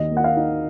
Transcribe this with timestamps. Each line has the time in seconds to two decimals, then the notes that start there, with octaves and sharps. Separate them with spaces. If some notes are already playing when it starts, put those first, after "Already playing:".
Already playing: D#2 D#5
0.11 A#3
0.17 F#5
0.24 F5
0.37 D#4